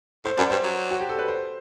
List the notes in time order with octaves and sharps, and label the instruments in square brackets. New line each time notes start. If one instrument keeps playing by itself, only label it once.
[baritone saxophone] A2 [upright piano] C5
[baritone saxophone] F#2 [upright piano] D5
[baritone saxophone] G2 [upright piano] C5
[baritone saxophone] F#3
[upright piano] F#4
G4
A4
B4
C5